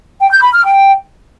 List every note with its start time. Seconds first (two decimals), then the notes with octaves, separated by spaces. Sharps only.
0.20 G5
0.31 G6
0.42 B5
0.53 F6
0.64 G5